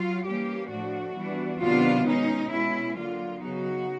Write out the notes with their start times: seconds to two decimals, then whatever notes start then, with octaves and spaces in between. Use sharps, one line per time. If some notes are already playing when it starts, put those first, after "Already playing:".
Already playing: F#3 F4
0.25 E3 G3 A#3 C#4 G4
0.70 A2 F3 A3 D4 F#4
1.15 E3 G3 B3 D4
1.60 C3 D#3 F#3 B3 D4 F4
2.05 B2 G#3 C#4 D#4
2.50 B2 G#3 C#4 E4
2.95 D3 F#3 A#3 F4
3.40 C#3 F#3 B3 D#4 F#4